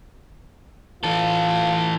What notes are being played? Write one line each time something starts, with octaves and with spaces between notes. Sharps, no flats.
E3 F4 A4